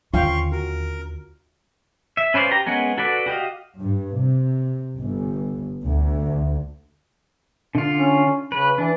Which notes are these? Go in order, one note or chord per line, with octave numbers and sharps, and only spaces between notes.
D#2 D3 C#4 F4 F5 G5 C6 C#6
F#4 A#4
E5
C#4 B4 C5 D5 F5
G4 A#5
G#3 B3 C#4 A#4 F#5
F#4 A4 B4 D5 F#5
F#4 G4 D#5 F5
G2
C3
G1
D2
D3 F4
C#4
C#3 B4
E3 D4